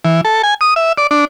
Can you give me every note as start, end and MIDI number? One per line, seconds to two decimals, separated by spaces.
0.05 0.21 52
0.25 0.42 69
0.43 0.54 80
0.61 0.74 87
0.76 0.92 76
0.98 1.07 74
1.11 1.25 62